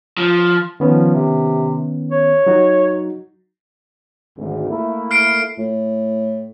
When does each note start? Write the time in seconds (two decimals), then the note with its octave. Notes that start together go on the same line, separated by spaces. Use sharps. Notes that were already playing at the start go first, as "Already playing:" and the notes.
0.17 F3
0.80 D#3 F3 B3 C#4
1.14 C3
2.12 C#5
2.47 F#3 D#4 F#4
4.37 G#1 D2
4.69 A3 A#3 E4
5.11 F6 C7 D7
5.58 A2